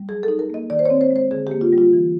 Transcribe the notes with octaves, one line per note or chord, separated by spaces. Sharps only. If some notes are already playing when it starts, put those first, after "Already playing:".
Already playing: G3
F#3 G#4
A4
D#4
A#4
A#3 D#5
D#3 D5
C5
C4 C#5
C5
G#3
C5
D3 G#4
A#3 G4
F4
G3
F4
E3